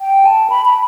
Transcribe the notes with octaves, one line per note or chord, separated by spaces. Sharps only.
G5
A5
B5
B5